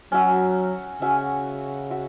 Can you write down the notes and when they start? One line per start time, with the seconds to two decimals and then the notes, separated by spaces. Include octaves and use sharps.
0.12 F#3 C#4 F#4 E5
1.01 C#3 C#4 F#4 E5
1.90 F#4 E5